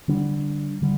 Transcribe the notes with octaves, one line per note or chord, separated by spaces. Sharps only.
D3 G3 D4
D3 G3